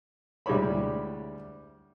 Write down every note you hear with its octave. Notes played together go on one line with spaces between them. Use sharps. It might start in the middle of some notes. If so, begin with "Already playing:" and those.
D2 G3 G#3 E4 C#5 B5